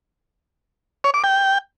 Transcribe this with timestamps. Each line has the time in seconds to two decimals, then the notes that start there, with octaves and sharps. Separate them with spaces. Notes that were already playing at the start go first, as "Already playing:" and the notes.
1.04 C#5
1.14 D6
1.24 G5